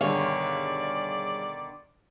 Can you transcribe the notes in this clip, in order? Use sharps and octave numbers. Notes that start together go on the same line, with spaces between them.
G2 B2 D3 D#3 G#4 C#5 D5 F5